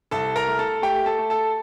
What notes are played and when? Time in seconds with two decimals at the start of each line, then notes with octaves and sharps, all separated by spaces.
0.11 C2 A4 A5
0.36 A#4 A#5
0.47 A3
0.59 A4 A5
0.82 A3 G4 G5
1.06 A4 A5
1.19 A3
1.30 A4 A5